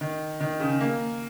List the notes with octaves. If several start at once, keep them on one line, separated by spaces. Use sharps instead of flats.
D#3
D#3
C#3
A#3